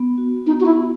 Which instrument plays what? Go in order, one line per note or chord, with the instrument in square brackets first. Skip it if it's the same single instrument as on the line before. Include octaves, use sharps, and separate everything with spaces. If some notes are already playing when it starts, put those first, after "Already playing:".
Already playing: [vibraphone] B3
F#4
[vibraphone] B3 [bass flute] D#4
[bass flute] F#4
E4
[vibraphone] D#4